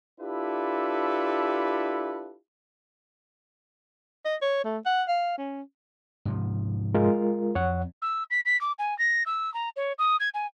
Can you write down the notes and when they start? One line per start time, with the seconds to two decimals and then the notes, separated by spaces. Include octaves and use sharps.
0.21 D4 E4 F4 G4 A4 B4
4.25 D#5
4.42 C#5
4.65 A3
4.86 F#5
5.08 F5
5.38 C#4
6.25 G#2 C3 F3
6.94 G#3 F4 A#4
7.55 F2 C#5 F#5
8.02 E6
8.31 B6
8.46 B6
8.61 D6
8.79 G#5
8.99 A#6
9.26 E6
9.54 A#5
9.76 C#5
9.99 D#6
10.20 G#6
10.34 G#5